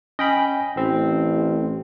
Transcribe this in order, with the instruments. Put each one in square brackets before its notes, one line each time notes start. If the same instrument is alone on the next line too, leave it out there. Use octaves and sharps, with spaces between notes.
[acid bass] C#4 [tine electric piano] D#5 G5 B5
[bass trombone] A1 [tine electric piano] C4